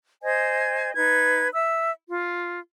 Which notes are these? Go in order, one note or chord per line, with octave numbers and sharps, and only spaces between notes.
C5 D#5 G#5 G#6
D#4 B4 G#6
E5 E6
F4